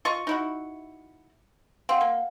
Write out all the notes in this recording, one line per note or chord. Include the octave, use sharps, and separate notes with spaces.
F4 D#5 C#6 C#7
D#4 E4 F#4
C4 F5 F#5
A#3